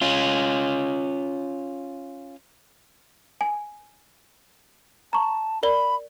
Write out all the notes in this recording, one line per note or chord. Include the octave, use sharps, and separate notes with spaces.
C#4 F4
G#5
A5 A#5 C#6
A#4 D5 B5 G7